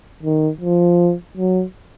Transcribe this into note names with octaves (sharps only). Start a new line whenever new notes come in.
D#3
F3
F#3